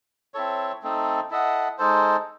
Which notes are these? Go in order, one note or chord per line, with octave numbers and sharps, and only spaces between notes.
C4 E4 A4 C#5
A3 C4 D#4 A4
E4 A4 D#5 F#5
G#3 D#4 A4 C5